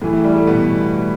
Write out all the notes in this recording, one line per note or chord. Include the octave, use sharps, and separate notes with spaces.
A2 E3 A3
A3
G3
A3
B2 B3